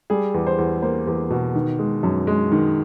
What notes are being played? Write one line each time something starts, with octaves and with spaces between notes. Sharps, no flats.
G3 G#4
E2
C5
E2
A#3 C5
E2
B2
D#3
G#3
F#2
G#3
D#3